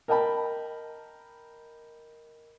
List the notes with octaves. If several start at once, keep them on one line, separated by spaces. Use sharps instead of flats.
A#4 D#5 G5 A5 B5